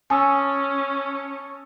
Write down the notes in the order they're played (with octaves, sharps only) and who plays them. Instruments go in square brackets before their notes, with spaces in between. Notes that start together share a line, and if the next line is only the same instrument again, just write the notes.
[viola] C#4 [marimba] G#5 [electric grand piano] A5 D#6 E6